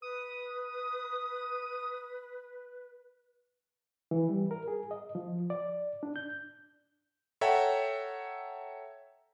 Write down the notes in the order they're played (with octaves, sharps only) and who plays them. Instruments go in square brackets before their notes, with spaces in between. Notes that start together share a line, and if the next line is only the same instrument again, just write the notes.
[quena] B4 [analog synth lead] D#6
[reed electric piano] E3
G3
A#4
G#4
D#5
F3
D5
D4
G6
[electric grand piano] A4 C#5 E5 F#5 G5 A#5